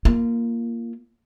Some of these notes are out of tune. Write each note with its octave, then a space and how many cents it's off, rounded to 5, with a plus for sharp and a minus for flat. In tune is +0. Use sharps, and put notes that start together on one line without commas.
A#3 +0 F4 -25